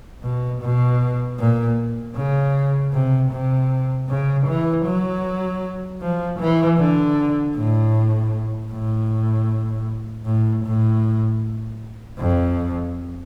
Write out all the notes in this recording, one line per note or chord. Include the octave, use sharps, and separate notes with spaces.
B2
B2
A#2
C#3
C3
C3
C#3
E3
F#3
F3
E3
D3
A2
A2
A2
A2
F2